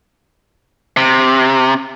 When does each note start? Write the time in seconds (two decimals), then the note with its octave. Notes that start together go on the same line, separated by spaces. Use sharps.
0.97 C3